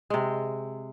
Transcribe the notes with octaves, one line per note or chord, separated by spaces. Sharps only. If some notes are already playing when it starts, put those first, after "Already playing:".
C3 G#3